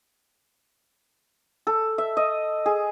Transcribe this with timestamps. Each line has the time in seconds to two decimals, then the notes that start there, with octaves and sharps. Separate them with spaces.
1.67 A4
1.98 E5
2.17 D#5
2.66 G#4